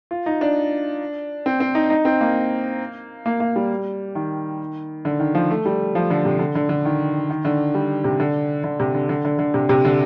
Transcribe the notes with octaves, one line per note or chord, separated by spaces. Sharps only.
F4
D#4
D4
C4
C4
D#4
D#4
C4
A#3
A#3
A#3
G3
D#3
D3
D#3
F3
A3
G3
F3
D3
C3
D3
D3
D3
D#3
D#3
D3
G3
C3
D3
D3
C3
D3
D3
D3
D3
C3
C3
D3